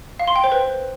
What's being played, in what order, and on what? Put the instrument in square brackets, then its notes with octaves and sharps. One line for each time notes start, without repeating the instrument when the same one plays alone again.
[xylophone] F5
C6
G5
C5
B4